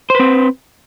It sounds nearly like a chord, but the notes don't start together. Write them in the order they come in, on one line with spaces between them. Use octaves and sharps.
C5 B4 C4